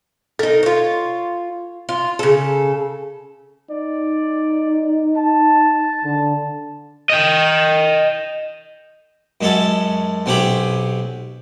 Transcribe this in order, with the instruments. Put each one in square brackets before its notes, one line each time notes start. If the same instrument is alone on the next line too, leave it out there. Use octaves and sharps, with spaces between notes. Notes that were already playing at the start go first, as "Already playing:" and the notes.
[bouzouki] D#4 A#4 [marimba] A4
[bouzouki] F4 C#5
F4
C#3 A4
[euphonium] D#4 [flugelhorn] D5
[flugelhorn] A5
[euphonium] D3
[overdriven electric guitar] D#5 G5
[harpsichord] F#2 G#3 C#4 A4 A5
B1 C4 C#4 G4 G#4 B5